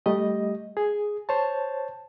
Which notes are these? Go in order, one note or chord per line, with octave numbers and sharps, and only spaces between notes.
G3 A3 G4 D#5
G#4
C5 C#5 A5